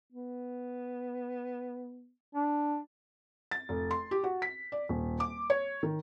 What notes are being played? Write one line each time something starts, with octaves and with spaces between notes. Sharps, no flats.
B3
D4
A6
F1
C6
G4
F#4
B6
D5
D#1
D6
C#5
D#3